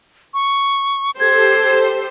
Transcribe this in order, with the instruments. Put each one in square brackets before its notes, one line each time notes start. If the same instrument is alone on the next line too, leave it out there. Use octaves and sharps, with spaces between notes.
[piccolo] C#6
[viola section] G4 A4 C5 [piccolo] G#6